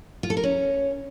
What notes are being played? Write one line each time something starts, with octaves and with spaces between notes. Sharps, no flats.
F4
A4
A#4
C#4